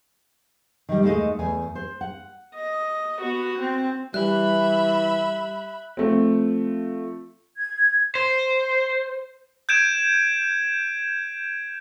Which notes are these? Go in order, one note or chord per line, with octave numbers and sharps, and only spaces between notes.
D#3 G3
D#2 G#3 A3 D#4 D#5
E2 A3 G#5
C5
F#5
D#5
B3 F#4
C4
E3 G3 E5 B5 F#6
F3 A3 C4
G#6
C5
G6 G#6 D7 E7